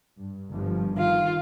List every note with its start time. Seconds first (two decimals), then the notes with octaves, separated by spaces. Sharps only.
0.20 G2
0.53 G1 G2 F3
0.98 D#3 F4